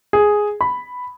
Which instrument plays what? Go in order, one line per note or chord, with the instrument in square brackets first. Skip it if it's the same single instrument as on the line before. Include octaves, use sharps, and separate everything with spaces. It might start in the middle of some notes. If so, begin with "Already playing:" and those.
[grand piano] G#4
B5